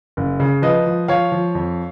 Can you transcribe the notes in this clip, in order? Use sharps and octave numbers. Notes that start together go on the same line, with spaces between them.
F#1
C#3
F3 B4 D#5
F3
F3 C#5 F5
F3
F2